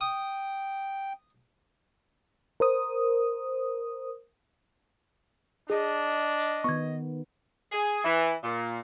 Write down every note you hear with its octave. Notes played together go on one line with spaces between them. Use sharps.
G5 D#6
A#4 C5 D#6
D4 G#4 D#5
D#3 B3 C#6 G#6
G#4
E3
A#2